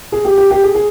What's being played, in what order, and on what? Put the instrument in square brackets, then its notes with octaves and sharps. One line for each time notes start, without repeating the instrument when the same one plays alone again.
[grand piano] G#4
G4
G4
G4
G#4
G#4